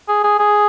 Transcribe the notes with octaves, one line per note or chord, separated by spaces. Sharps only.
G#4
G#4
G#4